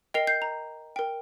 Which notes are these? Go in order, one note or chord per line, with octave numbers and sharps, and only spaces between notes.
A#4 D#5 G5 C7 F7
G6 C7
A#5
A#4 G5